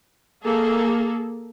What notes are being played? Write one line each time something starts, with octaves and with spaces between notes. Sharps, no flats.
A#3 G#4 A4